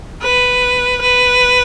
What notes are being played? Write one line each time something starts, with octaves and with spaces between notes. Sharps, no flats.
B4
B4